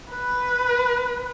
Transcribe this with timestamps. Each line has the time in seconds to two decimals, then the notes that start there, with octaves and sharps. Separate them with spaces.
0.12 B4